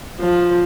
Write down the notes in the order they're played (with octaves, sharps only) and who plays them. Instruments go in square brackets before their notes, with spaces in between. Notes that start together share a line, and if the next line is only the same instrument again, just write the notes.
[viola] F3